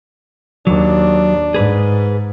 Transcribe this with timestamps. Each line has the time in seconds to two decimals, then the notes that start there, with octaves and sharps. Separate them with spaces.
0.67 D#2 F#3 D4
1.54 G#2 G#4 B4